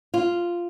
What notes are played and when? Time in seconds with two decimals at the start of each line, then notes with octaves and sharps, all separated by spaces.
0.14 F4